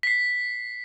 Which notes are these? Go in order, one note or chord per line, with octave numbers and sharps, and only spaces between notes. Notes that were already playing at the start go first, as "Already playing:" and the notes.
B6 C7